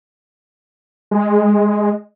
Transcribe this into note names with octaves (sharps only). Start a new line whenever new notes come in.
G#3